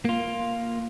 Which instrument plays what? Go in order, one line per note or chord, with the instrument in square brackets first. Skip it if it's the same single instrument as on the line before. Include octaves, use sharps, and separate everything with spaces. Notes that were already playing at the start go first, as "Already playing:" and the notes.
[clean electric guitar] A#3 F4